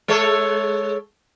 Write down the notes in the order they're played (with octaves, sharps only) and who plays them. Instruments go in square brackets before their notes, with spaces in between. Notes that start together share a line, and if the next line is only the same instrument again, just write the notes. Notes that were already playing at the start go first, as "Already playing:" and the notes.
[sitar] G#3 A4 C#5